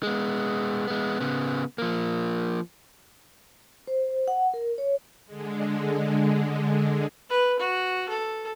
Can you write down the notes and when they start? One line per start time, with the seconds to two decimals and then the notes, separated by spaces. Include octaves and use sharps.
0.03 G#3 B3
0.87 G#3 B3
1.20 C#3 B3
1.78 F3 A#3
3.88 C5
4.28 F#5
4.54 A#4
4.78 C#5
5.26 D3 G#3
7.30 B4
7.60 F#4
8.09 A4